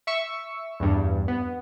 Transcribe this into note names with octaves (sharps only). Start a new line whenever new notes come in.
E5 C#6 E6
E2 G2
B3